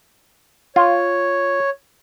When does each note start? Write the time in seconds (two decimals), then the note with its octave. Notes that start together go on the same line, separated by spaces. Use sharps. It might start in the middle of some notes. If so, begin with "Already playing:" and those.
0.76 F4 C#5